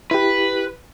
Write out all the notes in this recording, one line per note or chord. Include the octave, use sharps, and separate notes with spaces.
E4 G4 B4